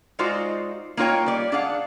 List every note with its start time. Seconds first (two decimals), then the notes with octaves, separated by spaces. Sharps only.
0.19 G#3 D#4 F4 F#4 C5 D5
0.97 A#3 D#4 F4 C#5 G5
1.26 G3 D5
1.52 D4 G#4 F5 F#5